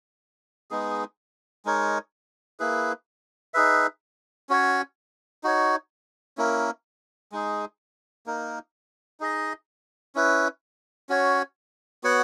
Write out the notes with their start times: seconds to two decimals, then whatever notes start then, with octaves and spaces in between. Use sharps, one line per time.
0.71 G#3 B3 D#4 G#4
1.65 G#3 D#4 A#4 C#5
2.60 A#3 E4 G#4 B4
3.54 D#4 G#4 B4 E5
4.49 C#4 F#4 C#5
5.43 D#4 F#4 C#5
6.37 A#3 C#4 E4 A#4
7.32 G#3 D#4 G#4
8.26 A#3 D#4 A#4
9.20 D#4 G#4 D#5
10.15 C#4 E4 B4
11.09 C#4 F#4 C#5
12.04 B3 F#4 C#5 F#5